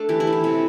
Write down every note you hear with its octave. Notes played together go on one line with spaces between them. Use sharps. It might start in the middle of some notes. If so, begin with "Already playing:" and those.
Already playing: A3 D4 A4
E3 G4
E4
E3
G4
C3